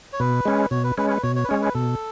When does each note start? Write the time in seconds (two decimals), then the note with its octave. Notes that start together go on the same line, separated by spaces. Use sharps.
0.13 C#5
0.20 B2 B4
0.45 G#3 C#4
0.71 B2 C#5
0.84 B4
0.98 G#3 C#4 B4
1.10 B4
1.23 B2 C#5
1.36 C#5
1.44 B4
1.49 G#3 C#4 C#5
1.61 B4
1.74 B2 A4